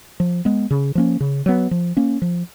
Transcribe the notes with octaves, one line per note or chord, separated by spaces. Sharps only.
F3
G#3 B3
C#3
F3 A#3 C#4
C#3
F#3 B3
F3
A#3 C#4
F3